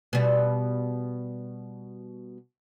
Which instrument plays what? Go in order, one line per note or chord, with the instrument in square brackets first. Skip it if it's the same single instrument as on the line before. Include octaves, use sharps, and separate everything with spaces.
[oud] B2 G3